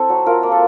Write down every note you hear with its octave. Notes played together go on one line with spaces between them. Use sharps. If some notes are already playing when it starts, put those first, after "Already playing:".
Already playing: C4 E4 A4
F#3
F4 A#4
A#3
A4